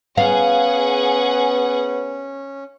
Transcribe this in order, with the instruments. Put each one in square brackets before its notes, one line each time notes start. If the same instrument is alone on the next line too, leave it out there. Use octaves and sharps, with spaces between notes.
[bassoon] B3 [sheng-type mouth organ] C#4 [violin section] G#4 F#5 G#5 [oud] F5